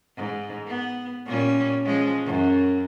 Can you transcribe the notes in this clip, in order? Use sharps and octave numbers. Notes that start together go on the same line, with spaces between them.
G#2
B3
A#2 G3 C#4
F3 G#3 C#4
F#2